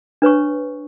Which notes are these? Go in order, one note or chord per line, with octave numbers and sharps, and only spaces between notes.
D4 B4 C#5 C#6